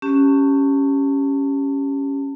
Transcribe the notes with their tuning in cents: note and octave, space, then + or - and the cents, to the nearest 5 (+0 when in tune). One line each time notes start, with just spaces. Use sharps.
C#4 +0 G4 +0 A5 +30